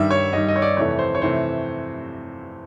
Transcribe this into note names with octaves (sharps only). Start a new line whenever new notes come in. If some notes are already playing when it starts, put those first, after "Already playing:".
Already playing: G2 D#3 G3 E5
C#5
G2 D#3 G3 D#5
D#5
C#5
D5
F2 C3 E3 A3 C#5
C5
C#5
C3 E3 A3 C5